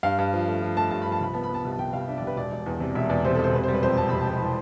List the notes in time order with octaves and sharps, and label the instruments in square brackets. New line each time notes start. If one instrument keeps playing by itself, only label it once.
[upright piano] G2 F5
G2
F3
A3
F3
A3 A5
G2 A5
F3 B5
A5
C2 B5
B3 A5
B5
B3
A5
C2
A5
C2 G5
C2 F5
D4 E5
D5
C2
B4
E1 D5
E1
E2
C3
E1 E5
E2 D5
C3 C5
A4
E1 C5
C3 B4
C5
G3
B4
F2 C5
F2 A5
C3 B5
A5
F2
B5
E3 A5